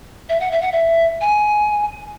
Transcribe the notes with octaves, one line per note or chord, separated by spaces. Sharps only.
E5
F#5
E5
F#5
E5
G#5